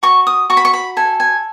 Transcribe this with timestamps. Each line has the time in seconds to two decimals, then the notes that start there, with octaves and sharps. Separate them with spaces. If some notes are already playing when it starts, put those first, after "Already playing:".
0.03 F#4 C#6
0.27 D#6
0.50 F#4 C#6
0.57 B5
0.65 C#6
0.74 B5
0.97 A4 G#5
1.20 G#5